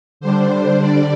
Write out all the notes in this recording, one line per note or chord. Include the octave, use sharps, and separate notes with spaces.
D3 G3 D4 C5
D5